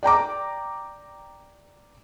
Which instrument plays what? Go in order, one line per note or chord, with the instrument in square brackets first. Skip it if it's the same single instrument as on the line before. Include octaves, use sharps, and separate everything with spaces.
[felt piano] D5 G5 A#5 D6